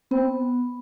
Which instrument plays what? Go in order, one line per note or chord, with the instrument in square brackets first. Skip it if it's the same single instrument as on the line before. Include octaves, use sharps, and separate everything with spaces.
[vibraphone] B3 [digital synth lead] C4